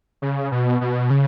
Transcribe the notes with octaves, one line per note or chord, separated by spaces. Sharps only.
C#3
B2
B2
C#3